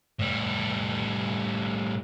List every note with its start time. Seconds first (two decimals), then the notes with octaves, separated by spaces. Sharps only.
0.19 A2 G3